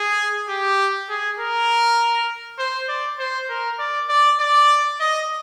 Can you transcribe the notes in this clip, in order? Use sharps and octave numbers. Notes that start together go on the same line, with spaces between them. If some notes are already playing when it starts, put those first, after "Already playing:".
Already playing: G#4
G4
G#4
A#4
C5
D5
C5
A#4
D5
D5
D5
D#5